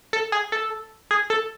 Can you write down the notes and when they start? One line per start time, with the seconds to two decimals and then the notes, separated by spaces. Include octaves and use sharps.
0.13 A4
0.32 G#4
0.52 A4
1.11 G#4
1.30 A4